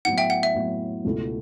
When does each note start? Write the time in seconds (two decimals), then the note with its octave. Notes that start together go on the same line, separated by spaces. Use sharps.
0.05 A2 F#3 B3 E4 F#5
0.18 E5 G5
0.30 F#5
0.43 E5
0.55 A2 F#3 B3 E4
1.05 C#2 B2 A3 E4